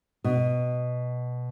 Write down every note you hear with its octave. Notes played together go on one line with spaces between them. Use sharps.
B2